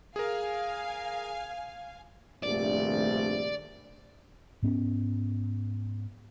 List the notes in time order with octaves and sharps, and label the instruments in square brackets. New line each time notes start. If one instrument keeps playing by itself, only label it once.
[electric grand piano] G#4 A#4 [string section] F5 G#5
[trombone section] A#1 G2 C3 [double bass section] D#3 A3 [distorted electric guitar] D5
[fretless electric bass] G#2 B3 C#4